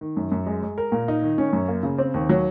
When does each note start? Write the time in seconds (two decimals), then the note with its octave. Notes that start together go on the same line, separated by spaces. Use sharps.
0.01 D#3
0.17 F#2
0.32 F#2
0.46 G#3
0.63 G#3
0.78 A#4
0.92 A#2
1.08 D#4
1.22 D#3
1.38 C#4
1.53 F#2
1.68 A#3
1.83 C#3
1.98 C4
2.14 D#2
2.29 F#3